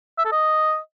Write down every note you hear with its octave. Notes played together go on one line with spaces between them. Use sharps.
E5
A4
D#5